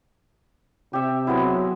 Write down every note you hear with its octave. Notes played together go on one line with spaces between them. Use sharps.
C3 G4 E5
F#3 G#3 B3 E4